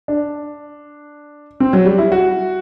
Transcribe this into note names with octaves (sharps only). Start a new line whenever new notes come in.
D4
C4
F#3
G3
E4
F#4